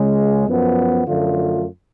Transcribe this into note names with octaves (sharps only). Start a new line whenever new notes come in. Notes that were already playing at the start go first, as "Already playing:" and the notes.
Already playing: C#2 C#3 G#3
F#2 F3 B3
F#2 D3 F3 A3 F4